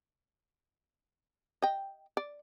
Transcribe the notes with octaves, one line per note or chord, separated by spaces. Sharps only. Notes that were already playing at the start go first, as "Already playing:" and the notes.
D#5 G5
D5